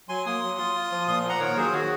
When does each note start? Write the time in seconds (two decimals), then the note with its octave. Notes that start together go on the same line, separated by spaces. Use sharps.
0.09 F#3 G#5 C6
0.26 A#3 C6 D#6
0.42 F#3
0.59 F4
0.75 F4
0.91 F3
1.07 A#2 C6 D#6
1.24 A#3
1.29 F#5 A#5
1.40 D#3 A#4 C#5
1.57 F#3 G#4 C5
1.72 D#3 F#4